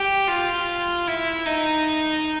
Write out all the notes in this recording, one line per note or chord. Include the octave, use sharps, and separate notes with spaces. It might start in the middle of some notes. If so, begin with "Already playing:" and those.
Already playing: G4
F4
E4
D#4